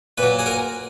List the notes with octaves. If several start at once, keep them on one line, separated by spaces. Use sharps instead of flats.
A#2 F#3 B4
G#4
A#4